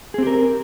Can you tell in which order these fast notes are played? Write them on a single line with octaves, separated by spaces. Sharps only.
G#4 C4 G4 A#4